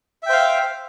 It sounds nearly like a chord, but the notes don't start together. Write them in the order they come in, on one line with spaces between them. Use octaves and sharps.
E5 G5 C5 F5